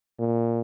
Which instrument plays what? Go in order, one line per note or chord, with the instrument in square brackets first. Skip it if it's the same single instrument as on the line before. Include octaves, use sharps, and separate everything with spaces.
[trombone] A#2